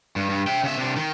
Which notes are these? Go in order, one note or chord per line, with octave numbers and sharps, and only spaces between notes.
G2
G2
E5 G5
C#3 E5
C3 D4
D#3